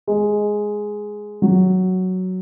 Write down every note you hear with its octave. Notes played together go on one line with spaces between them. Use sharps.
G#3
F#3